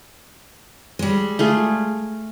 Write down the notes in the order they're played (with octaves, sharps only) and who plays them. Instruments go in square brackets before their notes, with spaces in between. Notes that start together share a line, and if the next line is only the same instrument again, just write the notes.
[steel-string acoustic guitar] G3 G#3
[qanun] A3 F4 G#4